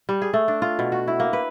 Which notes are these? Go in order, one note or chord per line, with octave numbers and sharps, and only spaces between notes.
G3
G#4
A3
D4
F4
B2
F#4
E4
A#3
B4